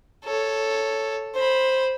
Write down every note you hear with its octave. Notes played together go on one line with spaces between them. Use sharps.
A4 C#5
C5 B5